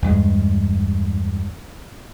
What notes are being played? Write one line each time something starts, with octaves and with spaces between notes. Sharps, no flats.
E2 G2 G#3